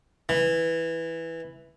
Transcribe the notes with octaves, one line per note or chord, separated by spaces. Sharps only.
E3